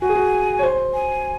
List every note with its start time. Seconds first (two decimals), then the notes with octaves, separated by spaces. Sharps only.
0.01 F#4 G#5
0.09 G#4
0.16 F#4
0.59 C#5
0.63 C5
0.94 G#5